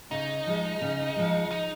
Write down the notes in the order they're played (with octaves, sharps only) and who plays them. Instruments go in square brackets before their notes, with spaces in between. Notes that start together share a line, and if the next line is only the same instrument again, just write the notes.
[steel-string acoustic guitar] C#3 [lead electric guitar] D#4
[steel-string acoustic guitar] F3 G#3
C#3
F3 G#3
[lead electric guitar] D#4